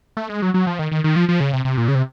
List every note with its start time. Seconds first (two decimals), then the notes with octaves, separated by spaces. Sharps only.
0.17 A3
0.30 G#3
0.42 F#3
0.54 F#3
0.67 F3
0.79 D#3
0.92 D#3
1.04 D#3
1.16 F3
1.29 F3
1.40 C#3
1.53 C3
1.65 C3
1.77 A#2
1.88 C#3
1.95 C3